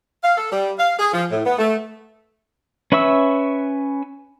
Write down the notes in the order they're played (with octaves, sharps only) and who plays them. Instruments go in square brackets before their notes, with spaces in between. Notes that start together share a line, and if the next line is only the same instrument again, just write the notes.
[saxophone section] F5
A4
G3
F5
G#4
F3
A2
B3
A3
[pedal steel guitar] C#4 B4 E5 C#6 E6